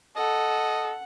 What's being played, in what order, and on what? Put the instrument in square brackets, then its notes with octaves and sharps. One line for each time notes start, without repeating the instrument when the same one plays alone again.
[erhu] A4 [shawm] D#5 [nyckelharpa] F#5